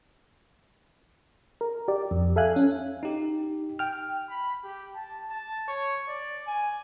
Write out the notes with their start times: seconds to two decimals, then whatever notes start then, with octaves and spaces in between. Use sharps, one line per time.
1.61 A#4
1.88 G4 D5
2.11 F2
2.36 A4 E5 F5 G#5 F#6
2.56 C#4
3.03 D#4 G4
3.79 G5 F6
4.30 B5
4.64 G4
4.95 A5
5.29 A5
5.68 C#5
6.08 D5
6.47 G#5